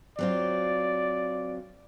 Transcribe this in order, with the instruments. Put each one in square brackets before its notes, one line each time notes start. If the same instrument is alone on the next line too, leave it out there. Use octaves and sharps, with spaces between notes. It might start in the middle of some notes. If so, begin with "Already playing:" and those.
[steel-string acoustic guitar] F#3 C4 F4 [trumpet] D5